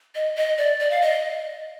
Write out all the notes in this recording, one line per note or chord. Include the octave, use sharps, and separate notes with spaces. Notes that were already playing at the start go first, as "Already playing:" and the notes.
D#5
D#5
D5
D5
F5
D#5